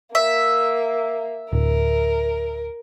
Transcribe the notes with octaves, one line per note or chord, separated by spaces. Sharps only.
A#3 E5
D1 A#4